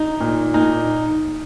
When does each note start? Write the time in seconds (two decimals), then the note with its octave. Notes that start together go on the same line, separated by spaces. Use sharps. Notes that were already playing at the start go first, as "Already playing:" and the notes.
Already playing: D#4
0.20 A#2
0.54 A#2 D#4